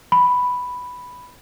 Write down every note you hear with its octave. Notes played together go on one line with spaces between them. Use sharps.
B5